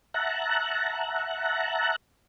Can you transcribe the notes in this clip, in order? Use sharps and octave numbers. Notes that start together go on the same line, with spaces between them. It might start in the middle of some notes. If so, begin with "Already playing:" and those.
E5 F#5 A5 A#5 F#6